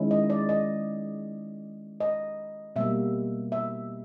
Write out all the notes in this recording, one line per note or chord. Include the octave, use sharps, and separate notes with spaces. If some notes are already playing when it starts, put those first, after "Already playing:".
Already playing: D#3 G#3 C#4 E4
D#5
D5
D#5
D#5
B2 G3 A#3 E5
E5